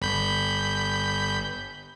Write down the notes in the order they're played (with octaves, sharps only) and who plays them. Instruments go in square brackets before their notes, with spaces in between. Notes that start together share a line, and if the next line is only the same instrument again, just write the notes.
[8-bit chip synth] G1 B5 G6